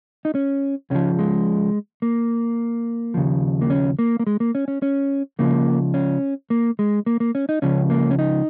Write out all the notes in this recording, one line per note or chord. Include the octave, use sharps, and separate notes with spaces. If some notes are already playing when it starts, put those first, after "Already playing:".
D#4
C#4
C#2 C#3 F3 C#4
G#3
A#3
D#2 C#3 F3
A#3
C#4
A#3
A#3
G#3
A#3
C#4
C#4
C#4
C#2 C#3 F3 A#3
C#4
A#3
G#3
A#3
A#3
C#4
D#4
C#2 C#3 F3 C#4
A#3
C#4
D#4